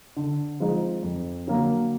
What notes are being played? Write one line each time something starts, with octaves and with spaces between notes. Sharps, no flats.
D3
F3 G#3 C4 D#4
F2
D3 F#3 A#3